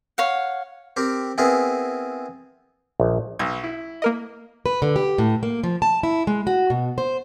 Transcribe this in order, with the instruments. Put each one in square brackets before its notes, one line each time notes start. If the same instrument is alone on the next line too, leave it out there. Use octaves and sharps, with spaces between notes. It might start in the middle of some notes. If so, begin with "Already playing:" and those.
[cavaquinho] C#5 F5 F#5
[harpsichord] C4 G4 A#4
B3 C4 E4 G#4 A#4
[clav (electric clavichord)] A#1
[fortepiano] B1 [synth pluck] G#6
[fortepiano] E4
[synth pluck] A#3 A#4 D#5
[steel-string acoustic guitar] B4
D3
G4
A2
A#3
F3
A5
E4
G#3
F#4
B2
C5